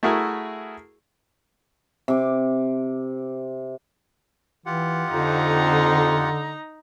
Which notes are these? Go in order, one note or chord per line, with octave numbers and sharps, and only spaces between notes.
A3 E4 F#4 G#4 A#4
C3 D6
E3 F4 G4 F#5
F2 D3 D#4 A#5